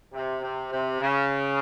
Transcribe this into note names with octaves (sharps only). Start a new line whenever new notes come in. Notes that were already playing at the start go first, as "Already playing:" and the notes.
C3
C3
C3
C#3